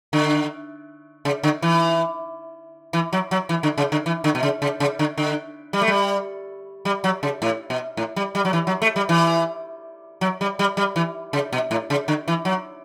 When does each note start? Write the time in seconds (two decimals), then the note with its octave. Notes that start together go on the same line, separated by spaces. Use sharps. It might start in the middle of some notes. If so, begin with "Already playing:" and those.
0.13 D3
1.25 C#3
1.43 D3
1.62 E3
2.93 E3
3.13 F#3
3.31 F#3
3.49 E3
3.63 D3
3.78 C#3
3.92 D3
4.06 E3
4.24 D3
4.35 B2
4.43 C#3
4.62 C#3
4.80 C#3
4.99 D3
5.18 D3
5.73 G3
5.81 A3
5.88 G3
6.85 G3
7.04 F#3
7.23 C#3
7.42 A2
7.70 B2
7.97 A2
8.16 G3
8.35 G3
8.45 F#3
8.53 E3
8.67 F#3
8.82 A3
8.96 G3
9.09 E3
10.21 F#3
10.41 G3
10.59 G3
10.77 G3
10.96 E3
11.33 C#3
11.53 B2
11.71 A2
11.90 C#3
12.08 D3
12.28 E3
12.45 F#3